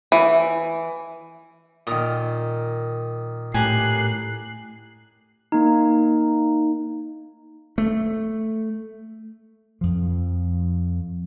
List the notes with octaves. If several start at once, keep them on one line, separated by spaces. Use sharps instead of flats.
E3
A#2 D#3 D#6 F6
A2 G4 A#4 G#5 F#6 C7
A#3 D#4
A3
F2 F3